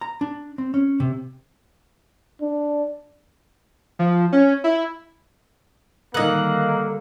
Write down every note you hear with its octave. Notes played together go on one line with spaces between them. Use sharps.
A#5
D4
C4
C#4
C3
D4
F3
C#4
E4
D3 D#3 G3 A#3 D#5 F#6